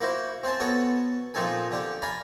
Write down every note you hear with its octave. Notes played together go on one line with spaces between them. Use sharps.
A#3 E4 F#4 C5
C4 C5 G#5 A5
B3 F#4 A4 C#5 F#5 A5
A#2 F3 C4 D#4 A4 G#5
D3 D4 G4
D5 F5 G#5 A#5 B5